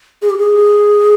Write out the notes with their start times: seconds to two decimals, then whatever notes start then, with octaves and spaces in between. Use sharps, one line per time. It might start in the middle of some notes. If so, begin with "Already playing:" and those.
0.22 G#4
0.30 G4
0.38 G#4